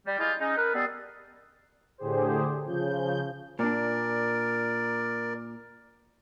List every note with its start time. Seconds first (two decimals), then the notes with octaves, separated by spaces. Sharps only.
0.06 G3
0.18 G#3 E4 F4 G4 D#5
0.39 G#3 C#4 D#4
0.56 A#4 B4
0.74 G3 B3 G#4 A4
1.98 A2 D3 G4 G#4 C5
2.65 C#3 F3 G6
3.59 A#2 D4 A#4 D5